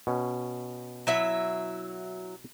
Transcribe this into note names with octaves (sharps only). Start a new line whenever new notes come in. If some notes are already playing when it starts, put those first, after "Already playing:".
B2 C#4
F#3 E4 E5